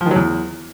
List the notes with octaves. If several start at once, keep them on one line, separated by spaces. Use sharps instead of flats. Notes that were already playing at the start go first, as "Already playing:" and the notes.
F3
D#3
F#3
E2